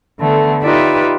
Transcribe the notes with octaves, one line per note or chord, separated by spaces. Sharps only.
D3 A3 B3
D#4 F4 G4 B4 D5 E5